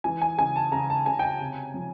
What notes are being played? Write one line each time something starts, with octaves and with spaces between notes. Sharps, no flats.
E3 G#5
G#5
C#3 G#5
A5
C#3 A#5
A5
C#3 G#5
G5
G#5
C3
F3